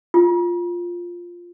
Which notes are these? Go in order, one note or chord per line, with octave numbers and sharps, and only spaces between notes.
F4